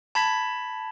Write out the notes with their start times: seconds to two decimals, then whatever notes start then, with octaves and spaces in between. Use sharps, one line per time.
0.15 A5 B5 G#6 B6